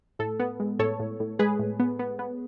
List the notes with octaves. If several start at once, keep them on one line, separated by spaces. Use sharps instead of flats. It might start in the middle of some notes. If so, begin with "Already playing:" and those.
A2 A4
B3
G#3
A2 A4 C#5
A2
A2
G#3 G#4 B4
A2
B3
B3
B3